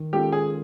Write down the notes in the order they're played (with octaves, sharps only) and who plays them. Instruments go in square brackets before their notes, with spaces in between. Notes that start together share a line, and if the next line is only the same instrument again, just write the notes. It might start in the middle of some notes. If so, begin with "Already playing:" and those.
Already playing: [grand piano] D#3
[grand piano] G#3 C#4 F4 A4 [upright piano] G4
[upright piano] G#4